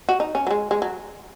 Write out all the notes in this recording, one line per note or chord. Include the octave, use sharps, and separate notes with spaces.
F#4
D#4
C#4
F#3
G#3
G#3
F#3